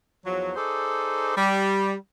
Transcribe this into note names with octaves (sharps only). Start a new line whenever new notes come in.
E2 F3 F#3
D#4 G#4 A4 C5 D5
G3